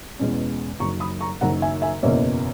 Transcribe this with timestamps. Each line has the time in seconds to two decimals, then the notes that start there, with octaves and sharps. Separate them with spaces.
0.19 E2 B2 G#3 C#4
0.80 F#1 F#2 D#3 F#3 A#5 C#6
1.00 B5 D#6
1.21 A#5 C#6
1.41 F#1 F#2 D#3 F#3 F#5 A#5
1.62 E5 G#5
1.82 E5 G#5
2.03 F#1 E2 B2 A#3 C#4 C#5 E5